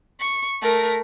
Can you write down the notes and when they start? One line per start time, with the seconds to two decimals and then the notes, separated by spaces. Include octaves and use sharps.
0.20 C#6
0.62 A3 A#4